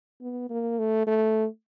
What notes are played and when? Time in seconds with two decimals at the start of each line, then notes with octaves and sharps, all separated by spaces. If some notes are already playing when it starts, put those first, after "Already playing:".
0.21 B3
0.50 A#3
0.79 A3
1.07 A3